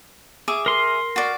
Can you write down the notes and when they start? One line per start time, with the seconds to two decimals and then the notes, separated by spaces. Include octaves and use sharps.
0.48 G#4 E5 D6
0.66 A#4 C6
1.16 F#4 D5